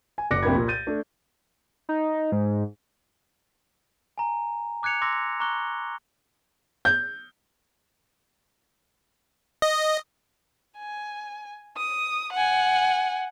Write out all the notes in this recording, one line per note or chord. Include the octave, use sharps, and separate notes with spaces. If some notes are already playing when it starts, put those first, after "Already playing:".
G#5
F#1 D5 D6 F#6 A#6 C#7
C2 F2 A#3 D4 B5 G#6
A#2
G6 A6 D#7
A3 D4
D#4
G#2
G#5 A#5
D6 F#6 G#6 C#7 F7
C6 D6 E6 A#6
A#5 C#6 D6 F#6 G7
G6
D#5
G#5
D#6
F#5 G#5